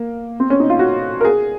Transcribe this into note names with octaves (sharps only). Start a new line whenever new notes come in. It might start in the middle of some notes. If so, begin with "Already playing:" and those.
Already playing: A#3
C4
C#4
D#4
F4
F#4
A#4
G#4